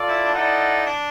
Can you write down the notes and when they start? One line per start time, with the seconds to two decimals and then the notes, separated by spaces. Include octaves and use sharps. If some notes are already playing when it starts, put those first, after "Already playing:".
Already playing: F4 A4 D5
0.08 E4
0.25 D4
0.34 D#4 E4 A4 D5 F#5
0.87 D4